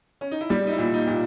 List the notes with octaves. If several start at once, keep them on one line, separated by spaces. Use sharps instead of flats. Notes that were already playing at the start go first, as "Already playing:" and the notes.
C#4
D#4
E4
G3 G4
D#4
E4
A#2
D#4
A#2